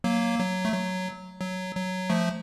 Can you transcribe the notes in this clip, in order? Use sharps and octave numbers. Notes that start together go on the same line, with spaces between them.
F#3 A#3
F#3
A3
F#3
F#3
F#3
F3 A3